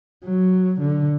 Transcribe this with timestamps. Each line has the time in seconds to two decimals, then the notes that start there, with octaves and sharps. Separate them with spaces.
0.24 F#3
0.81 D3